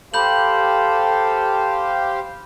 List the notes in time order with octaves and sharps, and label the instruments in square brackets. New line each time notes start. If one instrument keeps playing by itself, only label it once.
[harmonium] G4 C5 F5 [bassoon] A4 [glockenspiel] B5 G6 F#7